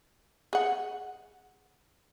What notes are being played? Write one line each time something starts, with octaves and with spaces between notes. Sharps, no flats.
G#4 F#5